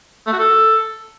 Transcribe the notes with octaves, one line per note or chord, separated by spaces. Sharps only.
A3
F#4
A4